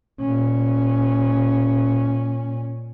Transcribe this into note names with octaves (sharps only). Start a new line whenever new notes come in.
A#2 C#4